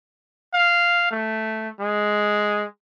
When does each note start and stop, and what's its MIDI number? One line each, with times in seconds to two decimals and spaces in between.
0.54 1.07 77
1.11 1.69 57
1.80 2.65 56